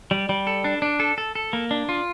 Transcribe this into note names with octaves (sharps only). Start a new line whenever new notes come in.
G3
G3
A4
D4
D4
A4
A4
A4
A#3
D4
F4